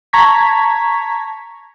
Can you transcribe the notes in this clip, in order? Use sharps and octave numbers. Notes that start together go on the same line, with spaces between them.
A5 A#5 C#6 G#6 B6